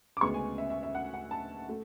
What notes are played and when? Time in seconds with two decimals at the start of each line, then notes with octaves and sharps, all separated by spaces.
0.17 D6
0.21 D2 C#3 G#3 B3 C#6
0.34 G#5
0.58 E5
0.70 E5
0.83 E5
0.95 F#5
1.14 F#5
1.31 A5
1.69 A3